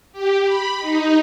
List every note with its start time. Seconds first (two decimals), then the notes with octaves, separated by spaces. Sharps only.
0.12 G4
0.45 B5
0.80 D#4